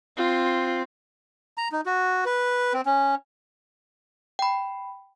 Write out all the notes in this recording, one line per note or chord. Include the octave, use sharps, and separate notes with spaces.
C4 F4
A#5
D#4
F#4
B4
C4
C#4
G5 B5